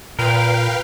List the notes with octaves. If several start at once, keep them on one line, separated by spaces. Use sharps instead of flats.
A#2 A#4 B4 F5 G5